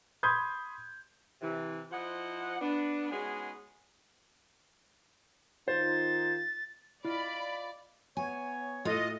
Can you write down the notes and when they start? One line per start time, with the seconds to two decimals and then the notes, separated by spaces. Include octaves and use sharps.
0.23 B5 C6 D#6 G6 G#6
1.41 C3 E3
1.91 F3 E4 C5 D#5 F#5
2.61 B3 D4
3.11 G#3 B3 C#4 D#4 F#4 G#4
5.68 D#3 D#4 F4 C5 A6
7.05 E4 F4 D5 D#5 F5 B5
8.17 B3 C#5 G#5
8.85 A2 F4 A4 D#5